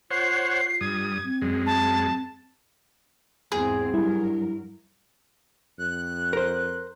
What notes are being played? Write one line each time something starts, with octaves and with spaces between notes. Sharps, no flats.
F4 C5 C#5 F#5 C7
G2 D#6 G#6
C4
F#2 G#3
A5
E2 G#2 C4 G#4
G2 F#3 G3 E4 A#4
F2 F#6
A#4 C5